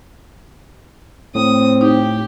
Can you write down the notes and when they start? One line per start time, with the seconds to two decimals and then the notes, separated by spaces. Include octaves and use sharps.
1.35 A2 C4 D#6
1.81 D#4 G4